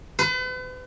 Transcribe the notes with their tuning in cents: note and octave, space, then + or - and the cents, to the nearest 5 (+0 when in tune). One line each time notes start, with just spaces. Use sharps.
B4 +40